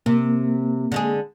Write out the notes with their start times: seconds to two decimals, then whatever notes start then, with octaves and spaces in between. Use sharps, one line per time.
0.06 C3 A#3
0.92 D3 G#3 G#4